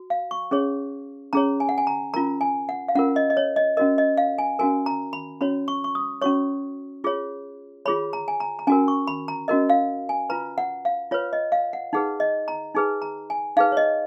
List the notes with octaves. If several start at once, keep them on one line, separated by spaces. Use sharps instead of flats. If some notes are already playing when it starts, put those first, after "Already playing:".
Already playing: F#4
F5
C#6
C#4 G#4 C#5
C#4 G#4 C#5 A#5
G#5
F#5
G#5
A#5
C#4 F4 A#4 A#5
G#5
F#5
F5
C#4 F4 A#4 F#5
D#5
D#5
C#5
D#5
C#4 F#4 A#4 D#5
D#5
F5
G#5
C#4 F#4 A#4 G#5
A#5
B5
C#4 F#4 C#5 B5
C#6
C#6
D#6
C#4 F#4 C#5 C#6
F4 G#4 C#5
F4 G#4 C#5 B5
A#5
G#5
A#5
A#5
C#4 F#4 A#4 G#5
C#6
B5
A#5
C#4 F#4 A#4 D#5
F5
G#5
F4 B4 A#5
F#5
F5
F4 B4 C#5
D#5
F5
F#5
D#4 G#4 B4 F#5
D#5
A#5
D#4 G#4 B4 G#5
A#5
G#5
D#4 G#4 B4 F5
C#5
D#5